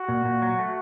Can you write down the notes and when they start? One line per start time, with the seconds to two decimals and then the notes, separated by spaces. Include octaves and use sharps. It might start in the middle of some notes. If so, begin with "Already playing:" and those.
Already playing: F#4
0.08 A#2
0.25 A#2
0.42 F#3
0.59 A3